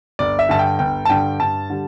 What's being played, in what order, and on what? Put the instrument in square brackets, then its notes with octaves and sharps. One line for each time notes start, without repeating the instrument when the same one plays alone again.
[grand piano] G1 D5
E5
G2 D3 A5
G5
G1 G5
A5
G2 D3 G5
G2 A5
D3 G3